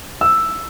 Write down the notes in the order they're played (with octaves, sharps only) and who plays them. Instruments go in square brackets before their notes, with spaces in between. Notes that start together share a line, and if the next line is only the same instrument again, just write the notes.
[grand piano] E6